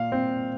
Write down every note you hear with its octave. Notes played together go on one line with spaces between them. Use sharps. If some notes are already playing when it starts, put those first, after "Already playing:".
Already playing: A#2 F5
C4